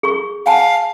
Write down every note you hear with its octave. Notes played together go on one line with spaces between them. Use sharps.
G#4 C#6
F5 F#5 G#5 A5